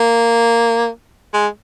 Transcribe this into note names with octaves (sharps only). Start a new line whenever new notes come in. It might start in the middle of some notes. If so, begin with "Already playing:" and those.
Already playing: A#3
G#3